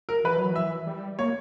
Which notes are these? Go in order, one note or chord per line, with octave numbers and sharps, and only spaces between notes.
A#4
E3 B4
F#3
E3 E5
G3
A#3 C#5